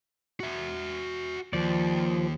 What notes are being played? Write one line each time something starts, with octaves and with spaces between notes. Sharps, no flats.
F#4 E5
D#2 F3 D5